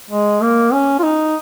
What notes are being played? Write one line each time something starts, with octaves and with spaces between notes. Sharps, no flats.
G#3
A#3
C#4
F4
D#4